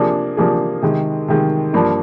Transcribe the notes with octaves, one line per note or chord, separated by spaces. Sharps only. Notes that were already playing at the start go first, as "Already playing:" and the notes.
Already playing: C3 F3 A#3 D4 G#4
C3 F3 A#3 D4 G#4
C3 D#3 G#3
C3 D#3 G#3
G2 F3 A#3 D4